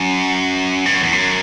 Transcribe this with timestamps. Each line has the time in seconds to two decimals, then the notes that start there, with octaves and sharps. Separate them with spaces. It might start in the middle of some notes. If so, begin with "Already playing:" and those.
Already playing: F#2
0.85 G2
0.95 F#2
1.03 E2
1.13 F#2